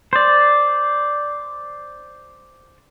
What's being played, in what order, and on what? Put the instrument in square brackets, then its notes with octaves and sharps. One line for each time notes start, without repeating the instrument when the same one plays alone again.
[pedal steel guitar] C5 D5